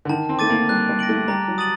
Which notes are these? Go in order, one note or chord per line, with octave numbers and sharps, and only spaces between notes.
D3
D#3 A5
C4
A3 D6 A6 D#7
A#3
G3 F#6
G3
A#6 D7 F#7
A3
G3 A#5
F#3
D#6 A6 D#7 F#7